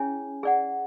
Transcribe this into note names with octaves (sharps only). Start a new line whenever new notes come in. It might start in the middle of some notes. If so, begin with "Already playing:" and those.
Already playing: C#4 E4 G#4 C#5 G#5
G#4 D5 F#5